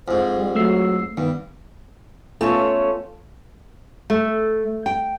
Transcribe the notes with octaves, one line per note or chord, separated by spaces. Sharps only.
F2 G#2 C5
G3
F#3 A3 E6 C7
G2 D#3 B3
A3 B3 C#4 F4 A4 C#5
A3
G5